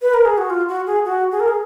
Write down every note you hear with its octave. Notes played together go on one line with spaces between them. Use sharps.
B4
A#4
G#4
F#4
F4
F#4
G#4
F#4
G#4
A#4
G#4